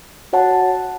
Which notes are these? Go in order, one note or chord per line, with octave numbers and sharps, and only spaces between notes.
F#4 C#5 F#5 A5